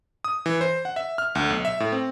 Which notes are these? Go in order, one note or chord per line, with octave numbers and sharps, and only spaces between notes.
D#6
E3
C5
F#5
E5
F6
D2
B1
E5
A2
C4